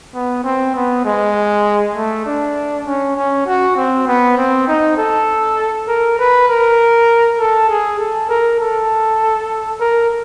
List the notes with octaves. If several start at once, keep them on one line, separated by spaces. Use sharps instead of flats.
B3
C4
B3
G#3
A3
D4
C#4
C#4
F#4
C4
B3
C4
D#4
A4
A#4
B4
A#4
A4
G#4
A4
A#4
A4
A#4